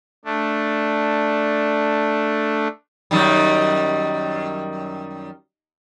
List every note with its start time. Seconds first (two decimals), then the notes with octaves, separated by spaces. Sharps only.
0.25 A3 D4
3.11 F#2 D#3 G3